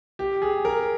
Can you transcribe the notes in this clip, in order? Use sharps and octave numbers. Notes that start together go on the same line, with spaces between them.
G4
G#4
A#4